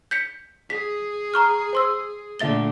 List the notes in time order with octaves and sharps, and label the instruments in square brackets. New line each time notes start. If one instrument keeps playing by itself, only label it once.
[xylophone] G6 B6 C#7
[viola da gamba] G#4 [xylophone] B6
[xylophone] A#5 C#6 F6
C5 C6 E6
[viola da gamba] A#2 D3 A3 [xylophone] E5 A6 G7